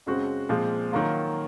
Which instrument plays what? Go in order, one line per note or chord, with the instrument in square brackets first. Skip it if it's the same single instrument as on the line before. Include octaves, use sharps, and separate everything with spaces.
[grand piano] F#2 C#3 G#3 C4 F#4
A#2 F3 G#3 C4
D#3 F#3 A#3 F4